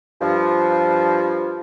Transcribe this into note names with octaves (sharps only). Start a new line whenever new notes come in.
G2 F3